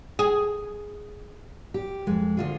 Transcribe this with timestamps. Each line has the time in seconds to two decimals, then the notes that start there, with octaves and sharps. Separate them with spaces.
0.19 G#4
1.74 G4
2.07 F2 G#3
2.37 D2 F4 G#4